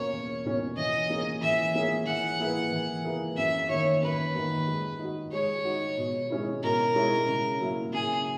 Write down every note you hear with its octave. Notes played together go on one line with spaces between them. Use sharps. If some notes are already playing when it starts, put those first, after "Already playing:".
Already playing: E2 B2 A#3 C#4 C#5
E2
B2 A#3 C#4
E3 D#5
A#3 C#4 G#4
E3 E5
A#3 C#4 G#4
E3 F#5
A#3 E4 G#4 B4
E3
A#3 E4 G#4 B4
F#2 E5
D#3 A#3 C#5
F#2 B4
D#3 A#3
G#3
D#4 F#4
G#3 C#5
D#4 F#4
B2
G#3 C#4 E4
B2 A#4
G#3 C#4 E4
C#3
F#3 A#3 E4 A#4
C#3 G#4